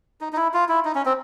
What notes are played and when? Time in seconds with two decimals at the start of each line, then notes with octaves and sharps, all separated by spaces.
0.21 D#4
0.33 D#4
0.37 E4
0.54 F4
0.69 E4
0.85 D#4
0.95 C#4
1.06 C4